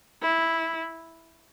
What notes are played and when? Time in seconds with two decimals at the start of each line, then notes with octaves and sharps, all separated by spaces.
0.23 E4